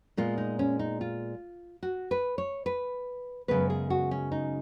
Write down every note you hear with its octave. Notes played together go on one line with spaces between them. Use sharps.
A#2 G#3 B3 F4
D#4
C#4
D#4
F4
F#4
B4
C#5
B4
F#2 C#3 G#3 B3 B4
G#4
F#4
C#4
D#4